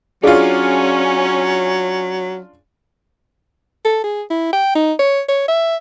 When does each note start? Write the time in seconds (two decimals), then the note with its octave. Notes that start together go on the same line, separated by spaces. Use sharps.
0.23 F#3 C#4 D4 F4 G#4 F5 G#5
3.85 A4
4.04 G#4
4.30 E4
4.53 G5
4.75 D#4
4.99 C#5
5.28 C#5
5.48 E5